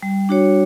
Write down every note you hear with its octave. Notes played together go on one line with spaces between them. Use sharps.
G3
D4 F#4 C#5